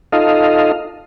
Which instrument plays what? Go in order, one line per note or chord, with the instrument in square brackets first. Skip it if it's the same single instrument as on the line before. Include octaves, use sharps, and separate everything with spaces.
[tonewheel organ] D#4 F4 A4 D#5 F5